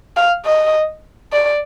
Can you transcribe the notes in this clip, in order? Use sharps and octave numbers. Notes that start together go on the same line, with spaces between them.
F5
D#5
D5